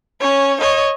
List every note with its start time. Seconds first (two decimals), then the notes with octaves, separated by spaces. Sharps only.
0.21 C#4 C#5
0.61 C#5 D#5